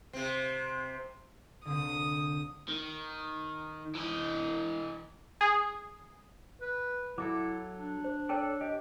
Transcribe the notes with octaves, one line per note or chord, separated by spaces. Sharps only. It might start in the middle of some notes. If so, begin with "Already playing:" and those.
C3 C4
C2 D3 D#6
D#3
E3 D#5
G#4
B4
F#3 E4 A4 E5 D6
D4
C5
A4 C#5 D5 G5 A5
G4 D#5